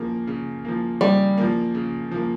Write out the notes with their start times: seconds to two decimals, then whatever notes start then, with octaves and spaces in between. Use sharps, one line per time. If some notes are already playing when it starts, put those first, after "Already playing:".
Already playing: C#3 F3 A#3
0.27 C#3
0.65 F3 A#3
1.01 C#3 G3
1.37 F3 A#3
1.75 C#3
2.11 F3 A#3